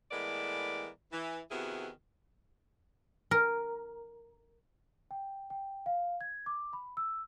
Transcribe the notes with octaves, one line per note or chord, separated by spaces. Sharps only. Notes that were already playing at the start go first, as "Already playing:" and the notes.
A2 E3 G#3 B3 A#4 D5
E3
C3 D#3 B3 E4 F#4 G#4
A#4
G5
G5
F5
G#6
D6
B5
E6